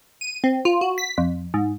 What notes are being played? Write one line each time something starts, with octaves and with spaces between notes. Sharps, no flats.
D#7
C4
F4
F#4
B6
F2
G#2